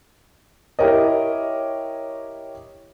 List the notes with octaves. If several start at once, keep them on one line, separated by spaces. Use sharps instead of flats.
E4 G4 A#4 C#5 D#5